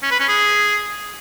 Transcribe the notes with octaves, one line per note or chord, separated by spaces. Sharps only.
C#4
B4
C#4
G#4